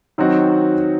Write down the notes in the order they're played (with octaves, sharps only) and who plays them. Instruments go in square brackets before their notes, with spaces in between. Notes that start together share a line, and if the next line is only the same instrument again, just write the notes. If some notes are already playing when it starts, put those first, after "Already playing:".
[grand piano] D#3 F#3 C4 D#4 F#4